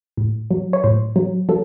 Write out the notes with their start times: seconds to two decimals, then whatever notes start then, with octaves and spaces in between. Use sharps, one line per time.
0.17 A2
0.51 F#3
0.73 C#5
0.84 A2 C5
1.16 F#3
1.49 F#3 A4